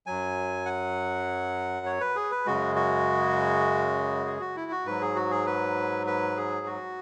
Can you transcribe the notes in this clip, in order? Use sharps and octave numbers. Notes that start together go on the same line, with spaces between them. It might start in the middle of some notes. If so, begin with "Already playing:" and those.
F#2 F#3 G#5
F#5
C#5
B4
G#4
B4
F#2 C#3 G#3 F#4
F#4
G#4
F#4
E4
F#4
G#2 F#3 B4
G#4
F#4
G#4
B4
B4
G#4
F#4